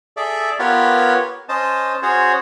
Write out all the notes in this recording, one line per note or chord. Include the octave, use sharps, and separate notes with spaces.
G#4 A4 D5 E5
B3 F4 G4 A#4 B4 C#5
C#4 C5 D#5 A5
C#4 F#4 G#4 C5 C#5